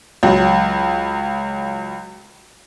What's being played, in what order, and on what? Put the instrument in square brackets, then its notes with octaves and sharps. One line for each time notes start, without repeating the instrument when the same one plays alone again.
[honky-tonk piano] C#2 F#3